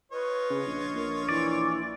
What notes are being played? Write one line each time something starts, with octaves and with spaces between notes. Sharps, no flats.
F4 B4 C#5 D#5
C#3
A#1
A#1 A#4
E3 D5